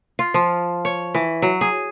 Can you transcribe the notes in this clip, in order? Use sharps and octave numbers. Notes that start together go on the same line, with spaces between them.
F4
F3
C#5
E3
F#3
G#4